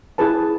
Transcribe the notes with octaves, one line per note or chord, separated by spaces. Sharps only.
E4 G#4 B4 A5